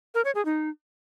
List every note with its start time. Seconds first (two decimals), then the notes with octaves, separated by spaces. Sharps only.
0.15 A#4
0.25 C#5
0.35 G#4
0.45 D#4